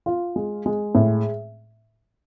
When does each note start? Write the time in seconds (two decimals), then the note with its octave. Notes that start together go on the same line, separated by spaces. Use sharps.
0.06 F4
0.36 G#3
0.66 G#3
0.95 A2